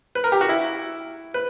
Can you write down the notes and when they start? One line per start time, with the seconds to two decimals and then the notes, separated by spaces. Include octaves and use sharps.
0.15 B4
0.24 A#4
0.32 G4
0.41 F#4
0.49 E4
1.34 B4